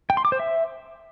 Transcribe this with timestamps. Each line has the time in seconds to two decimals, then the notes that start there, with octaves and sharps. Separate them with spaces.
0.10 G5
0.17 C6
0.25 D6
0.32 C5
0.40 E5